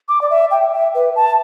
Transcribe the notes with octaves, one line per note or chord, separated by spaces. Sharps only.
D6
D5
E5
G5
E5
B4
A5